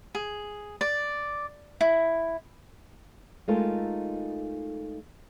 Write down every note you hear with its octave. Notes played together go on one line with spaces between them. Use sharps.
G#4
D5
E4
G#3 A3 D#4 F4 A4 A#4